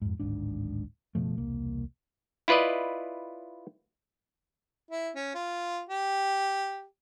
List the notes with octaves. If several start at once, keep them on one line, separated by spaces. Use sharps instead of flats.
F2 G#2
D1 G#1 G#2 D4
F#1 B2 F3 A3
E1 C2 A#3
E4 F4 B4 D5 D#5
E4
C#4
F4
G4